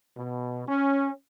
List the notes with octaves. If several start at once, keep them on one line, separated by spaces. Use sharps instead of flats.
B2
C#4